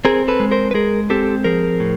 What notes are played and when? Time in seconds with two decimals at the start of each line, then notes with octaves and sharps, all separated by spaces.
0.05 C4 G#4 A#4
0.28 A4 B4
0.40 G#3
0.51 A#4 C5
0.71 B4
0.74 G#3 G#4 A#4
1.10 C4 G4 A4
1.44 F3 G#4 A#4
1.80 A2